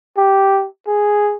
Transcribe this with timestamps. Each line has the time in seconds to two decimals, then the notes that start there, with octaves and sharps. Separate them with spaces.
0.17 G4
0.87 G#4